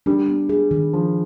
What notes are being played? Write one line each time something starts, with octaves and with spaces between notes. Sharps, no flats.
G3 D4
B3
G#4
D#3
F3 D4